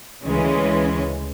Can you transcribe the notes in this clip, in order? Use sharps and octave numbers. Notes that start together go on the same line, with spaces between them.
D2 C#3 E3 G#3 C#4